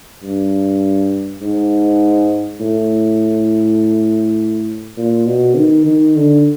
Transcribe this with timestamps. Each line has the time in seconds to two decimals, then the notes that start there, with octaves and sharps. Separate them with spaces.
0.23 G2
1.42 G#2
2.60 A2
4.97 A#2
5.27 B2
5.56 D#3
5.86 D#3
6.16 D3